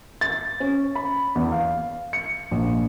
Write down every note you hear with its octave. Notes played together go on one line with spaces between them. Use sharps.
A6
C#4
B5
E2
F5
C#7
A#1